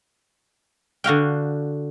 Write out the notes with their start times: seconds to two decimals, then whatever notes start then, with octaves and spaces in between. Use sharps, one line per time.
1.04 D3 F#4 F5 G5